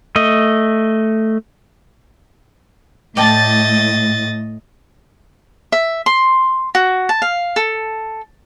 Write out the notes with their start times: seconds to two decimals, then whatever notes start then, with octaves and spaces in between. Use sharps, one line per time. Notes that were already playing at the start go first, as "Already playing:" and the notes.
0.16 A3 D#5
3.17 A2 D5 D#5 G5 A5 A6
5.72 E5
6.06 C6
6.75 F#4
7.09 A5
7.22 F5
7.56 A4